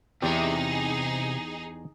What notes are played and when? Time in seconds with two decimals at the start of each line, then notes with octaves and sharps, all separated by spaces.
0.22 E2 C3 D#4 G4 G#4 D5 E5